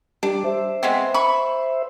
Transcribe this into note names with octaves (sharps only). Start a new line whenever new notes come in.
G3 D4 G4
C5 E5
G#3 B3 C4
B5 C#6